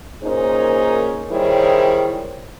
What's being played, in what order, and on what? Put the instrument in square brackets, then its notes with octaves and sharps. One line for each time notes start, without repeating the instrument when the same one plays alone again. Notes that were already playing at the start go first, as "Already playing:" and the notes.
[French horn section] A#2 C#4 D#4 G#4 A#4 C5
D#3 G3 E4 G#4 C5 C#5